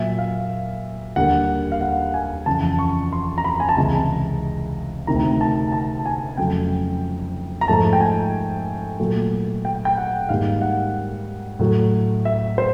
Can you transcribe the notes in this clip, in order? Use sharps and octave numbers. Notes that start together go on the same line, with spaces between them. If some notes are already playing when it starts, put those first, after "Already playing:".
Already playing: A#2 F#3 A#3 E5
F5
D#2 D3 G3 A#3 F#5
F5
F#5
G#5
F2 C#3 E3 A5
C#6
C6
A#5
B5
G#5
A5
C#2 C3 E3 G#3 A#5
D2 C3 D#3 A#5
A5
A5
G#5
F2 C#3 F#3 A3 G5
A#5
G#2 F3 A3 A5
G5
G#5
A#2 F#3 A3
G5
G5
F#5
G#2 D#3 G3 A#3 F5
F#5
A2 F#3 A3
E5
C5